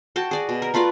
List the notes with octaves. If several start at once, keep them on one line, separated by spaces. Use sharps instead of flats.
F#4 G5 A5
G#4 D5
B2
A#4
A3 F4 B4 D5